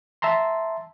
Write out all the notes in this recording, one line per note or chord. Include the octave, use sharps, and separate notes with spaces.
E5 A5 A#5 C6